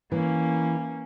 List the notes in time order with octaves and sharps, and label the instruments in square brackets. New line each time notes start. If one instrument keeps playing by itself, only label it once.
[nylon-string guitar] E3 [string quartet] A#3 C#4